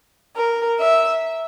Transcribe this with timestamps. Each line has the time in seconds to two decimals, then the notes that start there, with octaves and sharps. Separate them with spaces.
0.36 A#4
0.78 E5